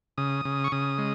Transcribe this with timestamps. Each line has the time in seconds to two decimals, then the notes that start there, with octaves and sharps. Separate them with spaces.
0.18 C#3 D#6
0.45 C#3
0.64 C#6
0.72 C#3 D#6
0.98 G#3